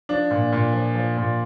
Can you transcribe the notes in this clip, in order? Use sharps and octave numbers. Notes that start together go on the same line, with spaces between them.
F3 D4
A#2
A#2
F3
F3
A#2